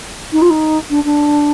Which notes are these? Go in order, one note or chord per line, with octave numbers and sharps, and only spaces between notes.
D#4
F4
D#4
D4
D4